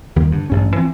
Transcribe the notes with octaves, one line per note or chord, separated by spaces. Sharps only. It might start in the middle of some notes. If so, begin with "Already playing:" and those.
D#2 D#3 G3 A#3
G2 D3
A1 G2 C#4
E3 F3 C4